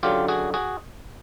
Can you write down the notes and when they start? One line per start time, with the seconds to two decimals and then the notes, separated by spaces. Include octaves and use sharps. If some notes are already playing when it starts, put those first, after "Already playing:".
0.03 F#2 D3 F#3 F4 G4
0.28 F#4 G#4
0.54 F#4 G#4